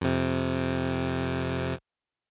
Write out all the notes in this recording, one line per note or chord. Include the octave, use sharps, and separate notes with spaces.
F2 C3